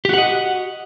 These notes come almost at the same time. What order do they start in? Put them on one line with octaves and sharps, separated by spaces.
G4 F#4 F#5 D#5